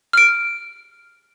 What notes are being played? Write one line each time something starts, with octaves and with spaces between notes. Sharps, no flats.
F6 D7